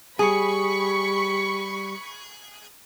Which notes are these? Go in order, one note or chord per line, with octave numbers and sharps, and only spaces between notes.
G3 G#4 B5 C#6